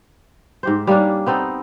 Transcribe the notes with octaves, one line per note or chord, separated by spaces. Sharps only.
G#2 G4 C5
G3 A#3 C#4 D4
B3 C4 D#4 A4